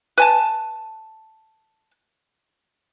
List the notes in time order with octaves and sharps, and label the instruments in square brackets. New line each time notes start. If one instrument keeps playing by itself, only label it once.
[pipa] B4 G#5 A5